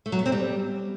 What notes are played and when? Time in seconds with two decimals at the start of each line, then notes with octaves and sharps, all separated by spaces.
0.06 A3
0.12 F#3
0.19 B3
0.26 C4
0.32 G3